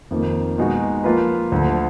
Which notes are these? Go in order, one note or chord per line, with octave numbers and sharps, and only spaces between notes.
F2 D#3 A#3
B2 G#3 D#4 F#4
F3 A#3 F4 B4
D2 D3 F3